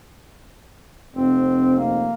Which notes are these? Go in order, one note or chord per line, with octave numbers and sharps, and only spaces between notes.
F1 C4
A#3